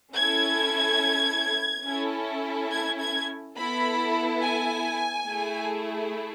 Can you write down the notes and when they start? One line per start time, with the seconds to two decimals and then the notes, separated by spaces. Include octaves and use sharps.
0.15 C#4 E4 A4 G#6
1.85 C#4 E4 A4
2.71 G#6
2.99 G#6
3.56 B3 E4 A4 B5
4.42 G#5
5.28 A3 E4 G#4